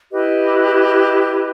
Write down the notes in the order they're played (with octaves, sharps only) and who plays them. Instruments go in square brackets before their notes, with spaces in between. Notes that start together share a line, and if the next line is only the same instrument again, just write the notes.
[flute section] E4 G4 B4 D#5